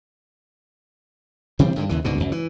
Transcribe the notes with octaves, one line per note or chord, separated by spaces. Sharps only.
C3 E3 G3 C4
G2 D3 D#3
D#2 C#3 E3
C#2 G#2 B2 D3
C#2 F#2
E3